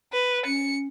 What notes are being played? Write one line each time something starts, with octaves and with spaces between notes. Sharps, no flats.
B4
C#4 C#7